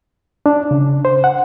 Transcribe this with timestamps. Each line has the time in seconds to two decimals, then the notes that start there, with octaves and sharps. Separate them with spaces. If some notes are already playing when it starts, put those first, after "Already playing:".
0.46 D4
0.71 C#3
1.05 C5
1.24 F#5